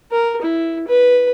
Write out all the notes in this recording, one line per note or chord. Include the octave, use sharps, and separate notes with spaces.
A#4
E4
B4